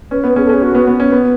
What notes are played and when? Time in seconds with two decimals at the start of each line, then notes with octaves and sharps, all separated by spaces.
0.11 C#4 B4
0.24 B3
0.28 B4
0.36 C#4 G#4
0.45 A4
0.49 C#4
0.53 G#4
0.62 C#4 F#4
0.75 B3
0.87 B3
1.00 C#4
1.12 B3